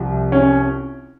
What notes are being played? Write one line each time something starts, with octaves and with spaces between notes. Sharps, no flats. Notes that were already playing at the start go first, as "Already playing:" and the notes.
Already playing: C2 C3 F3
C#4